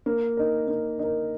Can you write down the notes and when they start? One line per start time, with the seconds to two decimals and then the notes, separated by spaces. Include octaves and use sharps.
0.06 A#3
0.37 D#4 A#4
0.68 A#3
0.99 D#4 A#4